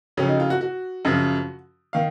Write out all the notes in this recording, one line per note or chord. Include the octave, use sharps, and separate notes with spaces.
F2 C#3 F#3 C#4
D#4
F4
F#4
F#4
F#2 C#3 F3
D#3 F5